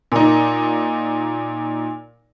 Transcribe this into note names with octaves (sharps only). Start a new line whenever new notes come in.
A#2 D#4